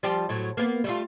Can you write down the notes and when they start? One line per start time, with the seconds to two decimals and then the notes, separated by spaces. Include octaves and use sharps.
0.03 F3 G3 G4
0.29 A2 F#3
0.57 A#3 B3
0.84 G3 A3 F4